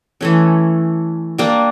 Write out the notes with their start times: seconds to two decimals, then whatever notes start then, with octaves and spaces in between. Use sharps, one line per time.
0.21 E3 A3 C#4
1.38 G3 A#3 D4